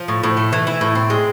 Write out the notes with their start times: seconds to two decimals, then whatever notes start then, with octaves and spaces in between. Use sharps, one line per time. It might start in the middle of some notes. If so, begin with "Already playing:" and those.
Already playing: F3
0.08 A2
0.23 A2
0.37 A3
0.53 E3
0.67 E4
0.81 A2
0.95 C4
1.10 G#3